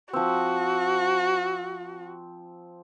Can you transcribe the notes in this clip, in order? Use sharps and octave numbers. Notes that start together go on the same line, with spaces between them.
F3 C4 F#4